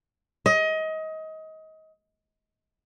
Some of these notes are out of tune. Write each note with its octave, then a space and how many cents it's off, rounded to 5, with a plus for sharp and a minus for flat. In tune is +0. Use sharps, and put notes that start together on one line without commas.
D#5 +25